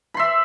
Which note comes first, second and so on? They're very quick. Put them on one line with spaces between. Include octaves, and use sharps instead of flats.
B5 C6 E5